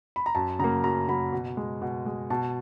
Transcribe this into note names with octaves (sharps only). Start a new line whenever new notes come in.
B5
A#5
F#2 A5
C#3 F#3 A#3 A#5
F#2 A#5
C#3 F#3 A#3 B5
B2
G#3
B2
G#3
B2 A5